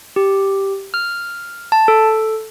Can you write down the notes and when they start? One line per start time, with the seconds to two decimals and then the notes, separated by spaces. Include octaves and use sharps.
0.16 G4
0.94 F6
1.72 A5
1.88 A4